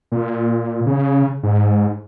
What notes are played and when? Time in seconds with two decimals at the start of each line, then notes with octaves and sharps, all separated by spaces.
0.12 A#2
0.86 C#3
1.43 G#2